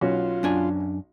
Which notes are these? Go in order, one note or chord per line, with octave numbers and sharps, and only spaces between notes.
B1 C#4 F4 F#4
F#2 D4 G#5